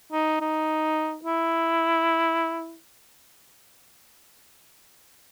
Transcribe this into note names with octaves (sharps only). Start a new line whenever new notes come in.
D#4
D#4
E4